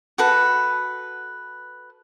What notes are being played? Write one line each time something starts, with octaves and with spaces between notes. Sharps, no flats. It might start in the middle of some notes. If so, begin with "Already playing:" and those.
F#4 A4 B4